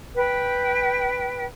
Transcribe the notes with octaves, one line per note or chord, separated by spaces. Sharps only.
B4 G5